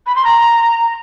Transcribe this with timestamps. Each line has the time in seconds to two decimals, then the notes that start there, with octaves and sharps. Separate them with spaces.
0.06 B5
0.16 C6
0.25 A#5